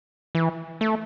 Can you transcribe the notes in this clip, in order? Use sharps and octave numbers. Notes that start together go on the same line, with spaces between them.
E3
A3